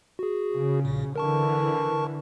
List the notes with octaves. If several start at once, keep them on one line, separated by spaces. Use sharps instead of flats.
F#4 G#4
C#3
A#1 A#2
D3 E3 A#4 A5 C#6